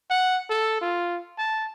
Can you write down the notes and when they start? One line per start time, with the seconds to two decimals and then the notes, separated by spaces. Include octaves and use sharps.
0.10 F#5
0.49 A4
0.81 F4
1.38 A5